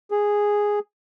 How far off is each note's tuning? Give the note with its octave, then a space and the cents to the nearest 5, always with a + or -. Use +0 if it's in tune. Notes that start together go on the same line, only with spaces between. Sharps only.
G#4 -5